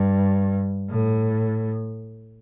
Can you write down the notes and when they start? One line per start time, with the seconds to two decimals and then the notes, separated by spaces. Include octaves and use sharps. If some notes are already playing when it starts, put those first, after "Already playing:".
Already playing: G2
0.89 A2